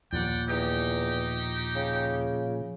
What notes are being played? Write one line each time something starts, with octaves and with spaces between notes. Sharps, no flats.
D#2 A#2 F3 D5 F#5 G5
E2 D#4 G4 G5
C#3